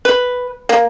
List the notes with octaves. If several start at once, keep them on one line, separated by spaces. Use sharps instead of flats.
B4
A#3